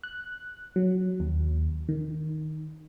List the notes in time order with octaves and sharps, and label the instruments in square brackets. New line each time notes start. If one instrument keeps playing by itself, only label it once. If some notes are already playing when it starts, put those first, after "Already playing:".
[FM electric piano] F#6
F#3
D#2
D#3